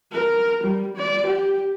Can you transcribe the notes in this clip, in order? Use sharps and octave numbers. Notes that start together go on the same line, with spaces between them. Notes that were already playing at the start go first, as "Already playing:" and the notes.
A#4
G3
D5
G4